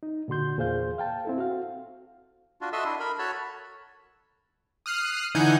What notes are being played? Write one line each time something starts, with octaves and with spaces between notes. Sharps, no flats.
D#4
A#2 D3 F#4 C6 G6
E2 A#2 G#4 C5 F5 G6
F5 G5 A5
C4 E4 A4
F#4 F5
D4 F4 F#4
F#4 A4 D#5 E5 C6 E6
D4 E4
A#4 B5
F#4 A4 C#5 A5 B5
D#6 F6 F#6 C7
D3 E3 D#4 F#5 G#5 G6